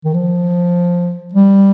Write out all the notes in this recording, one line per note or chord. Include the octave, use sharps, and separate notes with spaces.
D#3
F3
G3